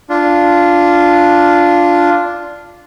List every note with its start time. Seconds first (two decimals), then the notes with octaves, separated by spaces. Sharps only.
0.09 D4 F4